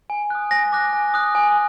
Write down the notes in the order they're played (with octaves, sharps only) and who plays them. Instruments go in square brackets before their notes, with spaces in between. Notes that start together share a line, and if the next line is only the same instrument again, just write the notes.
[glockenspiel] G#5
D#6 F#6
G#5 A#6
D6 F#6
G#5
D#6 F#6
G#5